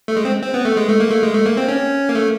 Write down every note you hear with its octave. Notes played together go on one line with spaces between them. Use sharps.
A3
G#3
C4
C4
B3
A3
G#3
A3
A#3
A3
G#3
A3
A#3
C4
C#4
A#3
A3